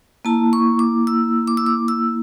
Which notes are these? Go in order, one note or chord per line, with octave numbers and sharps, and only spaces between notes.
A#3 E4 A5
C#6
D6
E6
D6
E6
D6
E6